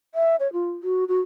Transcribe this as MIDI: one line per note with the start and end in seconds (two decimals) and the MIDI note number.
0.15 0.36 76
0.40 0.51 73
0.53 0.71 65
0.83 1.04 66
1.08 1.20 66